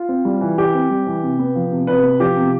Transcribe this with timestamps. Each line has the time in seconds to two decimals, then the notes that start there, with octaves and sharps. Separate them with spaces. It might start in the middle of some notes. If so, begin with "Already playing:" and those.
Already playing: F4
0.09 C4
0.25 G3
0.41 E3
0.57 E3 G4
0.74 C4
0.90 G3
1.06 E3
1.23 C3
1.39 B3
1.55 F3
1.71 C3
1.87 C3 B4
2.03 B3
2.20 F3 G4
2.37 C3